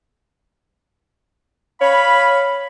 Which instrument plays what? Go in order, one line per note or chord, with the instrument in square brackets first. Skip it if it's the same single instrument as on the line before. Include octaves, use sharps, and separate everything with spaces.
[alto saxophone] C#5 [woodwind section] F5 B5